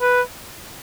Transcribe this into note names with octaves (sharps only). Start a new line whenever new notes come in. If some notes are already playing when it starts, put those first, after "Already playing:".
B4